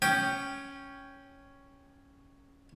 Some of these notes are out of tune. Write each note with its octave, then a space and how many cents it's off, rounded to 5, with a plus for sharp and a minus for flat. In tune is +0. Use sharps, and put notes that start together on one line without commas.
C#4 +0 G5 +0 D6 +45